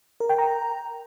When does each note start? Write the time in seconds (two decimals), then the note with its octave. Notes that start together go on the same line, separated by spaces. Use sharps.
0.20 A#4
0.29 G5
0.38 A#5